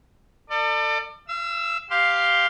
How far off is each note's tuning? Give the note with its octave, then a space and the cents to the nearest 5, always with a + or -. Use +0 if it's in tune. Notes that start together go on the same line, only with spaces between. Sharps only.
A4 +40 D5 +30
F5 -40 E6 +0
G4 +0 F5 +0 C6 +0